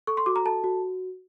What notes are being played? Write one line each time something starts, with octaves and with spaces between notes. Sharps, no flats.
A4 C#6
C6
F#4 D6
A#5
A4 A5
F#4